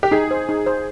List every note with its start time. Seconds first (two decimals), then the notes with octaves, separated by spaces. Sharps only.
0.03 G4
0.11 D#4 G#4
0.31 C5
0.49 D#4
0.66 C5